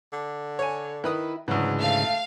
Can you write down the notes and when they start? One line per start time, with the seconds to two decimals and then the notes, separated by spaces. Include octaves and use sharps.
0.13 D3
0.59 C#5 G#5
1.04 D#3 E4 B4 D#6
1.48 D2 G#2 C#3 E3 F#3
1.81 A3 F5